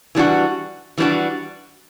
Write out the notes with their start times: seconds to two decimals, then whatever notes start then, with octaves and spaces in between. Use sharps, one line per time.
0.15 E3 G3 B3 D4 F#4
0.98 E3 G3 B3 D4 F#4